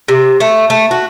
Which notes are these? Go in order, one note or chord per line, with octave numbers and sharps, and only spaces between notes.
C3
A3
A3
F#4